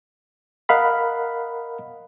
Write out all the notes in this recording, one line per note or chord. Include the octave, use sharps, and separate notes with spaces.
A#4 D#5 F5 F#5 B5